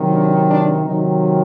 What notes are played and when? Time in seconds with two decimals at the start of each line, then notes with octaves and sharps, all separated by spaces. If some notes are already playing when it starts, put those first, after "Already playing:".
Already playing: C3 D#3 F#3
0.13 D4
0.49 D4
0.84 C3 D#3 F#3 D#4